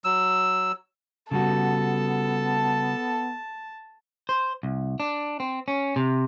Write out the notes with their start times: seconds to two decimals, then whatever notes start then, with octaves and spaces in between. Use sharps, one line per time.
0.04 F#3 E6
1.31 C#3 G3 B3 F#4 A4 A5
4.29 C5
4.63 C2
5.00 D4
5.40 C4
5.68 C#4
5.96 C3